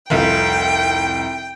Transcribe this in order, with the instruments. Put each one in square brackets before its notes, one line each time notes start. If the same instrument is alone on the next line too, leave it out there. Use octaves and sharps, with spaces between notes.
[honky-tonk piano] F1 C2 F4 [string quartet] G5